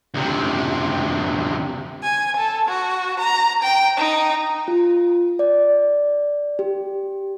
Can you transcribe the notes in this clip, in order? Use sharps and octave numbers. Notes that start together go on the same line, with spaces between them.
D2 C3
G#5
A4
F#4
A#5
G5
D#4
F4
D5
G4